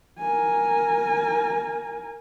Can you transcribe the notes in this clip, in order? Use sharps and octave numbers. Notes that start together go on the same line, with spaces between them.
A#4 G#5